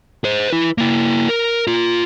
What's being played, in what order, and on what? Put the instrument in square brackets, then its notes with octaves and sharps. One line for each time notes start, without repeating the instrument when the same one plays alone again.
[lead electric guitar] G#4 C5
E4 B4
A#3 E4
A#4
F4 A#5